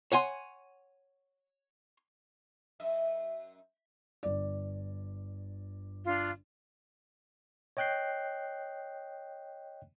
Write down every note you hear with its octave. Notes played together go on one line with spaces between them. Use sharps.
C#5 F#5 G#5 C6
F#2 D#5 E5
G1 D5
D4 F4 F5
C#5 D#5 G5 F#6 G6 C7